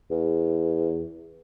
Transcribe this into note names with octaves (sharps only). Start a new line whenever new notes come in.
E2